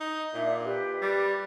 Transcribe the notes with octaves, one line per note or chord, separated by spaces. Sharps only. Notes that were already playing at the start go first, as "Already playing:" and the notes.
D#4
A#2 D4 D#4 E5
G4 B4
G3